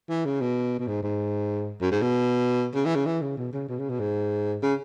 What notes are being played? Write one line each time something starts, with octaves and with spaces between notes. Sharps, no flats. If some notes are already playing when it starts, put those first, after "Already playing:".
E3
C#3
B2
B2
G#2
G#2
F#2
G#2
B2
C#3
E3
C#3
E3
C#3
B2
C#3
B2
C#3
B2
G#2
C#3